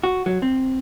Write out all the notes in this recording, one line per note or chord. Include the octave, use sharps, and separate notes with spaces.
F#4
F#3
C4